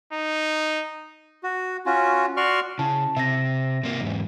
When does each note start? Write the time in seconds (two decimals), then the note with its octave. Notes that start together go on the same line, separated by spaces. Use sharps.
0.13 D#4
1.43 F#4
1.86 C#4 F4 F#4
2.37 F#4 D5 C6 C#6 F6
2.79 C#3 E4 A5
3.17 C3 E5 A#6
3.83 C3 A#3
4.01 E2 G#2